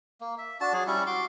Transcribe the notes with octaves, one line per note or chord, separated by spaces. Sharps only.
A#3
E5
D4 F#4 A5
F#3 G#4
G3 C#4 E4
F#4 C6 D6